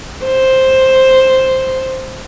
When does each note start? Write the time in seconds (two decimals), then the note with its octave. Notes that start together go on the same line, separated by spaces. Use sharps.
0.24 C5